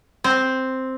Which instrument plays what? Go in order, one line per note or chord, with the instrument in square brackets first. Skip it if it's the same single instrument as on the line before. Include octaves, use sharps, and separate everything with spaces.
[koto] C4